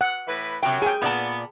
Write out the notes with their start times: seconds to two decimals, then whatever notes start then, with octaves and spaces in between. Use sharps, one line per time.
0.01 F#5
0.27 A2 E3 B4
0.63 F#2 C3 F#3 G5
0.82 G#4 G5 G#5
1.02 A#2 B3 D5 A5